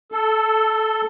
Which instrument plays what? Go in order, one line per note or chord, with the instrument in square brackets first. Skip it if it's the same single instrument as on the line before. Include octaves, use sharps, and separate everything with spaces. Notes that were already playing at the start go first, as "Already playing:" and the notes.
[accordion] A4